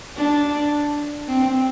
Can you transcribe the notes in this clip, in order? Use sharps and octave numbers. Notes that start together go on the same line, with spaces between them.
D4
C4